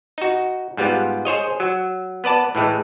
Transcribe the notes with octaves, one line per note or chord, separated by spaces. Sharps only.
D#4 F#4
G#2 G3 B3 F4 G4
G#4 C5 C#5 D#5
F#3
B3 B4 D5 A5
A2 E3 G#3 A3